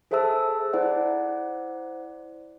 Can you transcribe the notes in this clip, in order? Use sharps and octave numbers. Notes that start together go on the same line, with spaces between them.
G#4 A4 C5 E5 A5 E6
E4 C5 D5 F#5